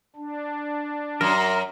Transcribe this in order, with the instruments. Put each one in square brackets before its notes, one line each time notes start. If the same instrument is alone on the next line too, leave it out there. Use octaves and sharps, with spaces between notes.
[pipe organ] D4
[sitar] F#2 [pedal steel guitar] A#4